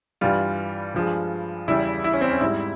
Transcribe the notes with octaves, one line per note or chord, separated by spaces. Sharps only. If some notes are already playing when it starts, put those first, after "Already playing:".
G2 E3 G3 F4
G2 F3 G#3
E2 C#3 G3 E4
E4
C#4
C4
C#4
G#2 G3 E4